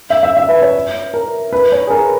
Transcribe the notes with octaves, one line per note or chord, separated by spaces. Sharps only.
E5
E5
E5
B4
C#5
A#4
B4
C#5
G#4
A#4